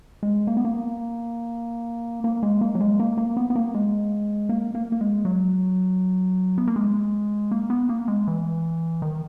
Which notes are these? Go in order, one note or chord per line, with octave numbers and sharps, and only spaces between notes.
G#3
A#3
B3
A#3
A#3
G#3
A#3
F#3
G#3
A#3
A#3
B3
B3
A#3
G#3
A#3
A#3
A#3
G#3
F#3
B3
A#3
G#3
A#3
B3
A#3
G#3
E3
D#3